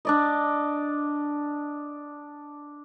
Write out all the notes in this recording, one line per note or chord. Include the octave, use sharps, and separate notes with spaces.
D4 D5 D#5